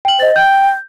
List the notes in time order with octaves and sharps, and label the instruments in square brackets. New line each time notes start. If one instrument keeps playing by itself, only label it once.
[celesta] G5 F#7
[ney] C5 [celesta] D#5 A6
[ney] G5 [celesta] G6